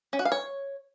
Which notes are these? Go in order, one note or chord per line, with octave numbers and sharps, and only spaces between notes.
C#4
F#4
F5
C#5